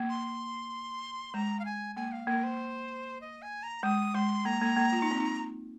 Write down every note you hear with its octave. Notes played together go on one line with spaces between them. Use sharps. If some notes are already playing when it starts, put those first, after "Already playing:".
Already playing: A#3
C6
G#3 A#5
F5
G#5
A#3 G#5
F5
A#3 A#4
C5
D#5
G#5
A#5
G#3 D#6
G#3 C6
A#3 A#5
A#3
A#3
F4
D#4
C4
D#4